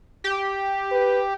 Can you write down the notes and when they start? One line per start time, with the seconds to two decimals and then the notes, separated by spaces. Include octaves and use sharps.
0.24 G4
0.92 B4